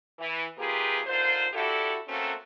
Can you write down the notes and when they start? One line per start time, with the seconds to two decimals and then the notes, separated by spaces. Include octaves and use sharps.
0.19 E3
0.57 C3 A#3 F4 G4 G#4 B4
1.07 D3 D#3 F4 C5
1.53 D4 E4 F#4 G4 A4
2.08 A3 A#3 C4 C#4 F#4 A4